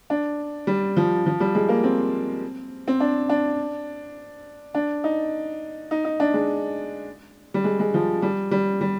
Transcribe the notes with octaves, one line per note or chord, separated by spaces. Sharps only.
D4
G3
F3
F3
G3
G#3
A#3
C4
C4
D4
D4
D4
D#4
D#4
D#4
D4
G#3
G3
G#3
G#3
F3
G3
G3
G3